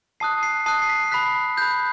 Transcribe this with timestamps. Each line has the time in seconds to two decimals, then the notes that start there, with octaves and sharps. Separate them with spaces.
0.20 A5 D#6 F#6 C7
0.43 C7
0.66 A5 D#6 F#6 C7
0.82 C7
0.89 B6
1.04 C7
1.12 B5 F#6 B6
1.57 F#6 G6
1.62 B5